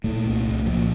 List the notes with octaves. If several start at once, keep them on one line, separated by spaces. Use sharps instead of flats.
A#2 A3
C2
C2
A#2 F3